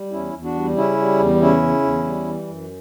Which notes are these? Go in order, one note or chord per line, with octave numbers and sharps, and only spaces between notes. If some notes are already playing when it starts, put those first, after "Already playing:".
Already playing: G3
E2 C#4 E4
E2
D4 F#4
G3
C#3 C#4 E4
G3
E2
C#3 C#4 E4
C#3
E2
G3
E3
F#2